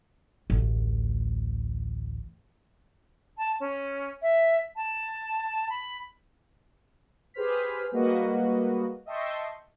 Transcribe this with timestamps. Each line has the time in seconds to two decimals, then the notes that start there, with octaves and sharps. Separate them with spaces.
0.50 A1 D2
3.38 A5
3.60 C#4
4.22 E5
4.76 A5
5.69 B5
7.34 G4 G#4 B4 C5 F6 B6
7.91 G3 G#3 A#3 F#4 B4 D#5
9.06 D#5 E5 G5 A5 C6 C#6